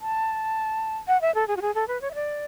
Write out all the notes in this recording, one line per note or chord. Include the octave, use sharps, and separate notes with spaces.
A5
F#5
E5
A4
G#4
F#4
G#4
A4
B4
C#5
E5
D5